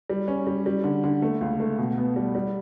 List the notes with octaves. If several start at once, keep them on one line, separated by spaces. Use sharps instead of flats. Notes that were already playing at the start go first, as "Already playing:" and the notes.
G3
C#4
G3
G3
D3
D3
A3
C#2
A3
B2
B3
G3
G3